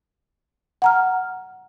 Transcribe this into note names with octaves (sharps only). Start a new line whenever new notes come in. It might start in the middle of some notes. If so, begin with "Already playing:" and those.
F#5 A#5 F6